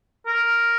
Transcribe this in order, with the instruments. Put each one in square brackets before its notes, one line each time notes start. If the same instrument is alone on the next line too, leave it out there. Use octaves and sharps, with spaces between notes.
[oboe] A#4